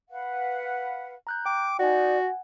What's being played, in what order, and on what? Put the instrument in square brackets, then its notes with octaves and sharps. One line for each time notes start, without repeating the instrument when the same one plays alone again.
[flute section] B4 F5 F#5
[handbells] A#5 F#6 G6
[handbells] G5 [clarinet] D6
[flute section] D#4 [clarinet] F#4 [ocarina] D5 [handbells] F#5 G#5